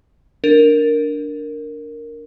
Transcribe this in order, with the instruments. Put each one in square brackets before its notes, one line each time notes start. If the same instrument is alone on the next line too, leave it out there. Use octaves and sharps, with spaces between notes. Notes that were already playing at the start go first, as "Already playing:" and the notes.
[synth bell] D4 A#4